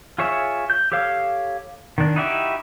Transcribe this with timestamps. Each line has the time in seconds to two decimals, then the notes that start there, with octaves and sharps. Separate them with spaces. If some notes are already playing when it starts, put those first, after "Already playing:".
0.18 F4 G#4 C#5 E5
0.70 G6
0.92 G4 A4 C#5 F5 F6
1.98 D#3 D4
2.16 D#4 E4 F#4 G4 E5